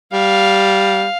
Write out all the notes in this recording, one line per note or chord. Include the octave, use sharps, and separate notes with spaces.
G3 F5